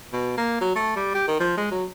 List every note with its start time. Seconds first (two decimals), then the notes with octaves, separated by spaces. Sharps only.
0.13 B2
0.38 A#3
0.61 F#3
0.76 A3
0.96 G3
1.15 G4
1.28 D#3
1.40 F3
1.57 G#3
1.71 F#3